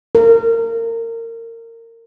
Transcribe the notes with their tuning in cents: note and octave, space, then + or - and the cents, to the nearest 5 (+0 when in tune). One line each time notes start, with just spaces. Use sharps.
A#4 -25